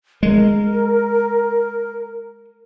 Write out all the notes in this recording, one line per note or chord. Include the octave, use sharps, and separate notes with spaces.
G#3 A#4